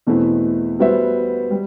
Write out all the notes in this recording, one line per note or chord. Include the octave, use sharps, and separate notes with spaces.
E2 B2 A3 C4 E4
G3 B3 F#4 C5 E5
G3